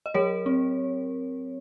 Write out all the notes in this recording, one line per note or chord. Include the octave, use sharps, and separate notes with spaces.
D#5
F#3 A#4 C#5
C4